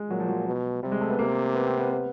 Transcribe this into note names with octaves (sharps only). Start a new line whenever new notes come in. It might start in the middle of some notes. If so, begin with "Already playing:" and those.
Already playing: G#3
A#2 F#3
F3
F#3
B2
C3 G3
G#3
A3
B3
C3 A#3
B3
C4
B3
B3